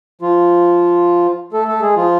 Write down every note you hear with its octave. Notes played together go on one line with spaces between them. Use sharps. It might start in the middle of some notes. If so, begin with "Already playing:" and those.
F3 F4
A3 A4
A3 A4
G#3 G#4
F3 F4